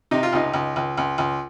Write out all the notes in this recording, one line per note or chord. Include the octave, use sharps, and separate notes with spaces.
C3 D#4
F4
C#2 D#4
C#2
C#2
C#2
C#2